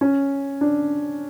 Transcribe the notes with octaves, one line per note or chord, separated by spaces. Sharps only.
C#4
D4